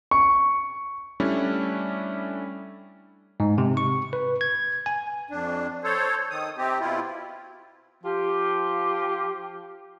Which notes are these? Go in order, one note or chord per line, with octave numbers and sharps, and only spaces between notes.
C#6
G3 A3 C#4 D4 E4
G#2
C3
C#6
B4
G#6
G#5
F2 D4
A4 C5 C#5
D#3 D#6
C3 C4 G4
B2 E4 F4
F3 F4 G4